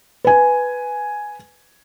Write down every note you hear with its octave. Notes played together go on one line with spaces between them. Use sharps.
B4 G#5